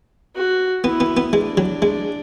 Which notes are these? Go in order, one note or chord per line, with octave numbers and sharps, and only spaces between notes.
F#4
B3 E4
B3
B3
G#3 D4
F#3
G#3